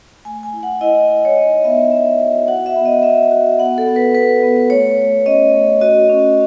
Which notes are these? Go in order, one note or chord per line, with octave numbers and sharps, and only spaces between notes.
A3 G#5
G#5
E4
F#5
E4 D#5
E4
C#5
D#4 D#5
B3 E5
B3 E5
F#4
F#4 F#5
E5
B3
D#5
B3 E5
F#4
B3 F#5
A4
B3
B4
B3 B4
B3
A3 C#5
A3
C#4 D#5
A3
F#4 D#5
C#4